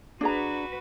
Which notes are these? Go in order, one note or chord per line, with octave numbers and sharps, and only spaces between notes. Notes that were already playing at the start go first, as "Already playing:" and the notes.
D4 F#4 G#4 B4 A#5